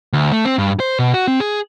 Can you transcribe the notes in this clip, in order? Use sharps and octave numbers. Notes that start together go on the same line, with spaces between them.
D2
A3
C4
G2
C5
B2
F#4
C4
G#4